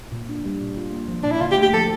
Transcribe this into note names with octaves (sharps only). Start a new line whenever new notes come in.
A#2
D4
G3
A#2
F4
A#3
F3
A#2 D4
E4
D3 F4
G4
A3
G4
F3 A4